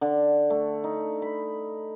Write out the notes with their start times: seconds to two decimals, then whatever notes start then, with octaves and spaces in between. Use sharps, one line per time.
0.01 D3
0.50 A3
0.84 D#4
1.22 B5